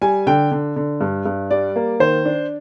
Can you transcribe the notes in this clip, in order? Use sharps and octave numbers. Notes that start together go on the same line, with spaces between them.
G3 G#5
D3 G5
D3
D3
G2
G2
G3 D5
A#3
D#3 C5
D4